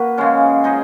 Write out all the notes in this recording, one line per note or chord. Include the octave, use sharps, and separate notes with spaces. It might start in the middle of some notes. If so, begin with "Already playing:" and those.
Already playing: A#3 F#4 B4
C#3 F3 G#3 C#4
G#3 D#4 G#4 D#5